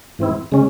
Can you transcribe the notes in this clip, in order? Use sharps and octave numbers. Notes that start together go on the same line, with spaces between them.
G#2 E3 C4 E4
C#3 G#3 C#4